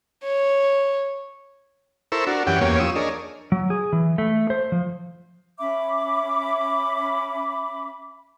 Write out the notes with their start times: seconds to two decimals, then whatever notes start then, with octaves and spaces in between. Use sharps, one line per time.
0.23 C#5
2.12 E4 A4 A#4 C5 C#6 E6
2.27 D4 F#4 A#4
2.47 F#2 E3 C#4 G4 F#5 G5
2.61 E2 A#3 C#4 G4 C#5
2.80 F3 C#6 D#6 E6
2.96 D4 G#4 A#4 C#5 D#5
3.52 F#3
3.70 G#4
3.93 E3
4.18 A3
4.50 C5
4.72 F3
5.58 C#4 E5 B5 D6